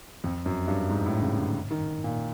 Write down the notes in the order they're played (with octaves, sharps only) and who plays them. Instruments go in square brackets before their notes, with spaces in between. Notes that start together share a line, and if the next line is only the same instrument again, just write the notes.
[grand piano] F2
F#2
G2
G#2
A2
C#3
D3
D#3
A#2